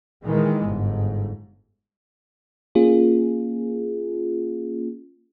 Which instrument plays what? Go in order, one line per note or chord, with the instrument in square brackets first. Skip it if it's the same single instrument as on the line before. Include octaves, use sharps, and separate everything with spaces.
[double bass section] A#2 D#3 E3 G#3
G1 G#2
[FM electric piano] A#3 C#4 F4 G#4